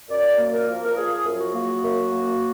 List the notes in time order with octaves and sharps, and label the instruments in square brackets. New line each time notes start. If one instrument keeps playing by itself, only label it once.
[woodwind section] F#2 D5
A#3
A#4
F3
A#4
F3 G#4
F#2
F#4
A#3
F#2
A#3